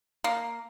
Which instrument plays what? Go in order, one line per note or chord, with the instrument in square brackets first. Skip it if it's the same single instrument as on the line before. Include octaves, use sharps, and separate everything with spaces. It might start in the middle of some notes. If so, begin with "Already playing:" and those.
[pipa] A#3